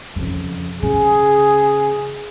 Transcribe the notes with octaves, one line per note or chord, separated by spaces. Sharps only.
F2 C#3
C#3 G#4